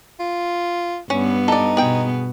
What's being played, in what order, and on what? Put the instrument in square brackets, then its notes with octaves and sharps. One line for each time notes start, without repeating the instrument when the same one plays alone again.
[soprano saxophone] F4
[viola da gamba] G2 B3 [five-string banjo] C#4
[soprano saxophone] D#4 [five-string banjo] A4 D5
[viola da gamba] B2 B3 [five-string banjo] G#4 G5